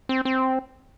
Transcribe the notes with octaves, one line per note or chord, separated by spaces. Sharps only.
C4
C4